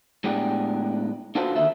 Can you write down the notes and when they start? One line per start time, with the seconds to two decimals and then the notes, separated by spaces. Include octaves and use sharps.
0.24 A2 G#3 B3 D4 G4
1.35 D4 F4 F#4 A4 B4 C5
1.55 D#2 D3 A4 E5